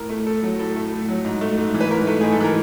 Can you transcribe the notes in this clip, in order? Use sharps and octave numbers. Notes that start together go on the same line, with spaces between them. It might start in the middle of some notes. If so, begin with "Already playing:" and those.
Already playing: A2 A#4
A3
A2 A4
F#3
A2 A4
A3
A2
F#3
G#2
A3
G#2
E3
B4
G#2 A#4
A3
G#2 G#4
A4
E3 A#4